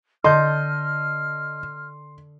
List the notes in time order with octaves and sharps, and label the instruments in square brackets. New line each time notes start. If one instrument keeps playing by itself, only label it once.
[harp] D3 A5 G6 [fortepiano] D#5 [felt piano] C6 [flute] F6